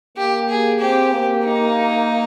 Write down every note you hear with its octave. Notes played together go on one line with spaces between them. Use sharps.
A#3 G4
G#4
C4 G4
A#3
D#4